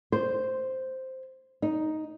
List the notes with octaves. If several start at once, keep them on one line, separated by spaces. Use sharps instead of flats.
C5
D#4